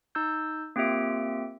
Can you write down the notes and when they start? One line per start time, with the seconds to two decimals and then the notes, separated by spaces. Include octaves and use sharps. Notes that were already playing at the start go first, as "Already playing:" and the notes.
0.15 D#4 E6 G6
0.76 A#3 C4 F4 G4 E5 D7